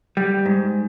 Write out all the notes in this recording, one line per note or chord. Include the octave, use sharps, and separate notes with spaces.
G3
G#2